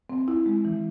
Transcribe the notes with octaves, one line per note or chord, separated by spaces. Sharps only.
C4
E4
G#3
E3